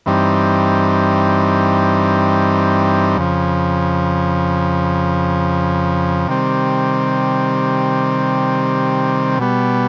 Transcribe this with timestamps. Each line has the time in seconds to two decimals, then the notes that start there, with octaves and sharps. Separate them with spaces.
0.06 G2 E3 G3 C4 D#4
3.17 F2 C#3 F3
6.28 C3 D#3 G3 C4
9.39 B2 G3 B3